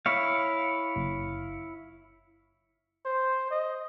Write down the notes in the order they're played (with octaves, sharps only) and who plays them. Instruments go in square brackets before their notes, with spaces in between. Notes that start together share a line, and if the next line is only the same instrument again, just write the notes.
[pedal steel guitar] E4 C#5 F5
[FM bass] F#1
[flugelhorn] C5
D#5